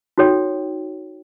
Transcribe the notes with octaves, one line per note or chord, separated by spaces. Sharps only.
D#4 F#4 A4 C#5 G5